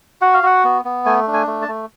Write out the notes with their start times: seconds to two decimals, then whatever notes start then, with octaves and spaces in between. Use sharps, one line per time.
0.21 F#4 F#5
0.34 F5
0.43 F#4 F#5
0.64 B3
0.85 B3
1.05 A3 G#5
1.27 D4
1.34 G#5
1.47 A3
1.62 A5
1.68 A3